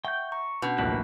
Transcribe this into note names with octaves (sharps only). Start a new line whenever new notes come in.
E5 F#5 G5 C#6 G6
A#5 C#6
B2 C#4 D4 G6
D1 A1 F3 A#3 E4 B4 F#6